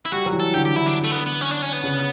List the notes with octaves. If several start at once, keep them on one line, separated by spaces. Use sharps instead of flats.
E4
G3 F#4
F#3
E3
A4
D3 G4
G4
D3 E4
D4
A3
B3
B3
C#4
D4
C#4
B3
C#3